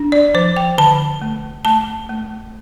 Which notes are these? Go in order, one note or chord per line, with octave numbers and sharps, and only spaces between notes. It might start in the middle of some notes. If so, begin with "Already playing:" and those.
Already playing: D4
D5
F3 C5
G5
D3 A5
A3
A3 A5
A3